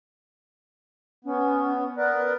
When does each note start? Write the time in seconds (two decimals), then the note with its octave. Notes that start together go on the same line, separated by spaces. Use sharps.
1.25 B3 C#4
1.96 B3 A#4 B4 D5